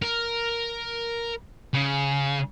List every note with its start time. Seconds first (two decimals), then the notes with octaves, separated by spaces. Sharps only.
0.02 A#4
1.74 C#3